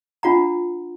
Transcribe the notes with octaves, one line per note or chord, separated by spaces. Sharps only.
D4 F4 F#5 A#5